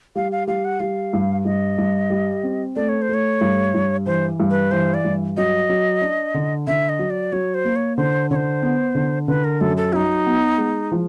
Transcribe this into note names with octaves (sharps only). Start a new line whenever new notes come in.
G3 F5
F5
G3 F5
F#5
G3 F5
G2
G2 D#5
G2
G3
C4
A3 D5
C#5
C5
A3 C#5
G2
G2
E3 C5
G2
B4
E3 C5
D5
G2
F#3 D#5
F#3
D4
D3
D3 E5
D#5
F#3
D5
F#3 C#5
C5
A#3
C#5
D3 C5
D3 C5 C#5
B3
D3
D3 B4
A#4
F#2 A4
A4
F#3 D#4 E4
B3
G#3
F3